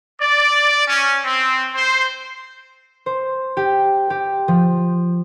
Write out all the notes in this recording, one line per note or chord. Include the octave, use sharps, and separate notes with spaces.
D5
C#4
C4
C5
C5
G4
G4
F3